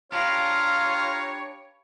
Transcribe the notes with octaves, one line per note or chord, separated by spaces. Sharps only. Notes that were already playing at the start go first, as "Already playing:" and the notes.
D4 F4 G4 B4 C#5 F5 A#5